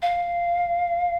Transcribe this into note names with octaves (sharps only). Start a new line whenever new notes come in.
F5